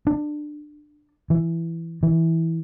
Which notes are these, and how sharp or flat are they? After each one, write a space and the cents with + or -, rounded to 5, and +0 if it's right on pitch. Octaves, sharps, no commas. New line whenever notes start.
D4 +20
E3 +10
E3 -10